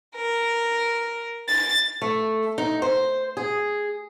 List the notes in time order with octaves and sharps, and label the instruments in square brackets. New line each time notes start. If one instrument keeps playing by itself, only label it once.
[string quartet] A#4
A6
[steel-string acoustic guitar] A3
D#4
C5
G#4